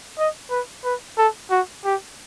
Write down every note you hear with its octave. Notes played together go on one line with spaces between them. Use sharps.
D#5
B4
B4
A4
F#4
G4